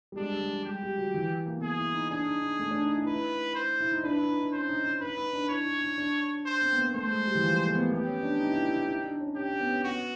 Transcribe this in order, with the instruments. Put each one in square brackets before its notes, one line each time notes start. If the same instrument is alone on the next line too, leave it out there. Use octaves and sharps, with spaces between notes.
[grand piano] G3
[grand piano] G#3 [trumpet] D4
[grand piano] G3
G#3
G#3
[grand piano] G3 [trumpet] G4
[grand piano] G3
F#3
E3
A#3
B3
[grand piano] A#3 [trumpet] G#4
[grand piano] E4
D#4
[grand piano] D4 [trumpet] G#4
[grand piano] D#4
D#4
A3
D4
D#4
E4
[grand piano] D#4 [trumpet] B4
[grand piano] E4
[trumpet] C5
[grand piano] E4
D#4
[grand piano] D4 [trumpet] B4
[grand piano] E4
D#4
D#4
[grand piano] C#4 [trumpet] C5
[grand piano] D#4
D#4
[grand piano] D#4 [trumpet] B4
[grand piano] D#4
D4
[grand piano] E4 [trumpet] C#5
[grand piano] E4
D#4
D4
[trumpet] C5
[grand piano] C4
B3
A#3
[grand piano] A3 [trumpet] C5
[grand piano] G#3
G3
E3
F3
G#3
A3
B3
A#3
[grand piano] B3 [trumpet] G4
[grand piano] C#4
D4
D#4
E4
E4
D#4
D#4
D4
C#4
[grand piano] C#4 [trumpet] G4
[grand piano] C#4
B3
C#4
[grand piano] B3 [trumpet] F#4